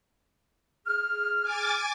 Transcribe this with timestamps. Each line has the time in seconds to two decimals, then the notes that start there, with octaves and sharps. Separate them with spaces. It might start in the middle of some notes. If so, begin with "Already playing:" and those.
0.86 G#4 F6
1.43 G#5 D6 A6